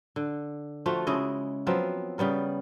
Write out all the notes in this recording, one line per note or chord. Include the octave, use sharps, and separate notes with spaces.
D3
F3 A3 F4 F#4
C#3 G#3 E4 D#5
F3 F#3 B3 C4
C#3 G3 B3 A#4